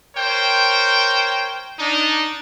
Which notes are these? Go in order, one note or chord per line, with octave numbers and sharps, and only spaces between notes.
A#4 C5 C#5 G5
D4 D#4